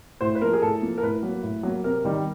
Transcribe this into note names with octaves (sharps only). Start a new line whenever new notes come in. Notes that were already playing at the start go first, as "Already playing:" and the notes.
A2 C5
B4
F3 A#3 A#4
G#4
A2 A4
F3 A#3
A#4
A2 B4
F#3 A#3
A2
F#3 A#3
C3 A#4
D#3 G3